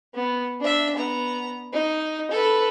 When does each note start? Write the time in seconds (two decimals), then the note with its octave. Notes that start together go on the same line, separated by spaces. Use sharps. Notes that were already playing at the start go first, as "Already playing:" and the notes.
0.14 B3
0.61 D4 E5
0.96 B3 A#5
1.73 D#4
2.31 A4 B4